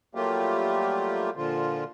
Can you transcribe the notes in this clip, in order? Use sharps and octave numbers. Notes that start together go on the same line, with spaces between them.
F#3 G3 A3 A#3 F4 G4
A#2 D3 F3 F4